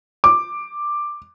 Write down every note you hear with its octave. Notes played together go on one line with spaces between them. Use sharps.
D6